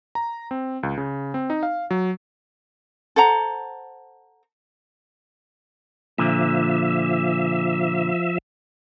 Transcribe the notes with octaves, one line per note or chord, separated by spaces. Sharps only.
A#5
C4
C#2
C#3
C4
D#4
F5
F#3
A4 C5 F#5 A#5
A#2 D3 F3 E5